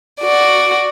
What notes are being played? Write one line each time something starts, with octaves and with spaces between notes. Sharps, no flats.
F#4 D5